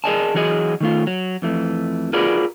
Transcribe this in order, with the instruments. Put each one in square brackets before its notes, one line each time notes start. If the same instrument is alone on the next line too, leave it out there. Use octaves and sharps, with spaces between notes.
[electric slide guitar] G#4 A#4 D5 D#5 G#5 A5
E3 F#3 F#4 G#4 D#5
D#3 A3 F4
F#3
F2 E3 A3
F4 F#4 G#4 A#4 B4 D5